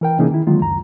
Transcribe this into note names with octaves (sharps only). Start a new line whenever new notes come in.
E3 A#4 G5
C3 E3 A#3 C#4 D#4 G#4
D#3 E4
D3 D#3 F#3 G#3 A#3 F4
C#2 F#2 A#5